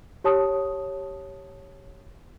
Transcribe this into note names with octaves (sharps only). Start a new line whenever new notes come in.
G4 C#5 A5 D#6